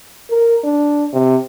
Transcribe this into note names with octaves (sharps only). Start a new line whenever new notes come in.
A#4
D4
C3